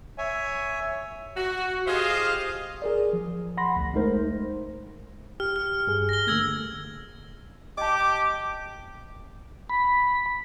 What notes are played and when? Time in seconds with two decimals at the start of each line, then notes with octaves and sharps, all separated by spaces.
0.18 C#5 E5 G#5
1.37 F#4
1.87 F4 G4 G#4 C5 D#5 F5
2.82 G#4 A#4 D5
3.13 F3
3.57 F#5 B5 C6 A#6
3.76 A1 D2
3.94 G#3 A3 D#4 A#4 C5
5.40 G4 F6
5.56 F6
5.87 G2 G#4
6.09 A#6 G7
6.27 D3 A3 A#3 E6 G#6 A#6
7.78 G4 D#5 A5 D6
9.70 B5